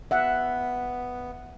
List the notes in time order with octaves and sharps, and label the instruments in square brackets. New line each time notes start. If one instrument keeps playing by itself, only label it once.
[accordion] B3 [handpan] E5 F#5